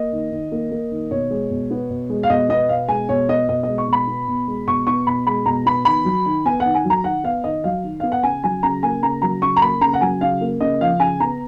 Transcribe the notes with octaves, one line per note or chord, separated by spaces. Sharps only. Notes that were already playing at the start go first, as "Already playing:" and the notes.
Already playing: A#3 D#5
D#3
D#3
A#3
A#3
D#3
B2 C#5
G#3
B2
B3
B2
G#3
F5
B2 D#5
B3 D#5
B2 F5
G#3 G#5
B2 C#5
B3 D#5
B2 D#5
G#3 D#5
C#6
B2 B5
B3
B2
G#3
B2 C#6
B3 C#6
B2 B5
G#3 B5
B2 A#5
B3 B5
D#3 B5
F#3
D#3
B3 G#5
F#5
D#3
G#5
F#3
A#5
D#3 F#5
B3 F5
D#3 D#5
F#3 F5
D#3
B3 F5
F#5
C#3 G#5
F#3 G#5
C#3 A#5
A#3 G#5
C#3 A#5
F#3 A#5
C#3 C#6
A#5
A#3 B5
C#3 A#5
F#5
F#3 G#5
C#3 F5
A#3
C#3 D#5
F3 F5
C#3 G#5
B3 A#5